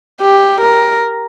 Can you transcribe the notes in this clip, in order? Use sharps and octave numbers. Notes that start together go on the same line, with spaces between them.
G4
A#4